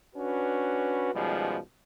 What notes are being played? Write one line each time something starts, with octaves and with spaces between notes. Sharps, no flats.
C#4 D4 F#4 B4
B2 D#3 F3 G3 G#3 C#4